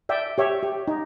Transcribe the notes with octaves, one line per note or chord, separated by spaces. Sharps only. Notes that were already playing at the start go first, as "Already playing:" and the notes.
D5 E5 G5
G4 C#5 E5
G4
D#4